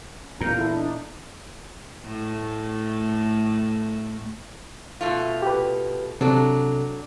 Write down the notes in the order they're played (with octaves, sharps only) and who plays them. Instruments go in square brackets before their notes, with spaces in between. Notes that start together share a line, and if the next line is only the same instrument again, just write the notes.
[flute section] C#4
[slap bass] E2 A#2 [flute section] F4 F5 G6 [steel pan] A#4 A#5
[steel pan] E4 A4
[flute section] D4 D#4
[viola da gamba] A2 A3
[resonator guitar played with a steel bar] B2 A3 F4
[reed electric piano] G4 B4
[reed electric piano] C3 A4 [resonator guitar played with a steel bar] F#3 D4